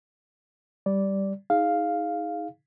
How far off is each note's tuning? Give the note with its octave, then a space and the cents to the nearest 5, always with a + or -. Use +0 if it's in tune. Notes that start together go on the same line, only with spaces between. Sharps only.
G3 +0 D5 -10
D#4 +25 G#4 +0 F5 +0